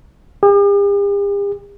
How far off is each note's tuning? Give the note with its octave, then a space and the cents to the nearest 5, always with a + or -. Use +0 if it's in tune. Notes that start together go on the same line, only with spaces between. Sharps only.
G4 +45